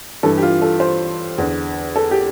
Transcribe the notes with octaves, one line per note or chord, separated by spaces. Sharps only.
G2 E3 A4
G4
F4
A4
C5
E2 D3
A4
G4